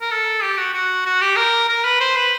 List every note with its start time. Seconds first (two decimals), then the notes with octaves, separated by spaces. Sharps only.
0.01 A#4
0.11 A4
0.42 G4
0.58 F#4
0.74 F#4
1.06 F#4
1.21 G4
1.36 A#4
1.69 A#4
1.85 B4
2.00 C5
2.16 B4